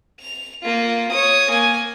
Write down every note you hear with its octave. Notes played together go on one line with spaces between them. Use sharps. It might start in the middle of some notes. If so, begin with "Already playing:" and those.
F7
A#3 F4
C#5 D#6
A#3 G#5